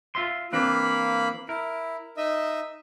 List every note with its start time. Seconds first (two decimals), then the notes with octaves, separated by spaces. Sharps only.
0.15 F4 E5 C6
0.53 E3 A#3 C4 D4 F5 B5
1.49 E4 A#4
2.17 D#4 D#5 E5